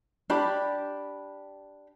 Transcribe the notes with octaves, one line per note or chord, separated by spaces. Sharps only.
D4 G4 B5